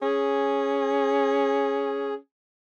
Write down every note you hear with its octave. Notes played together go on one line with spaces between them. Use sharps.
C#4 G#4